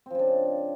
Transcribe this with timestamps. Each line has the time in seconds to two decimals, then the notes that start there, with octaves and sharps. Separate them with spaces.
0.06 C4
0.10 F3
0.15 C#3
0.19 D4